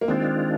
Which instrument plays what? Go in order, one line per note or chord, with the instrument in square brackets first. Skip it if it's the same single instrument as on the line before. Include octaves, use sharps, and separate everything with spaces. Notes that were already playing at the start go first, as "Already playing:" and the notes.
[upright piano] A#3
[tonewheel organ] D#3 G#3 D4 F4 [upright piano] C4